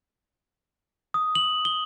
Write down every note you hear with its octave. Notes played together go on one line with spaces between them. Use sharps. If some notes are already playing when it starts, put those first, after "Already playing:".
D#6
F#7
G7